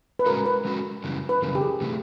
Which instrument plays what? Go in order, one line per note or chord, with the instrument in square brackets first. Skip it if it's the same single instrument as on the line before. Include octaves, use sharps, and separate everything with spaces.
[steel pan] B4
[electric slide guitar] G#3 C#4 F#4 A4 [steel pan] A#4
[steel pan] B4
[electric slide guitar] G#3 C#4 F#4 A4
F#2 C#3 E3 G3
[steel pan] B4
[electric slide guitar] F#2 C#3 E3 G3 [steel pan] A#4
[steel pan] G4
G#4
[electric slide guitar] C3 E3 A3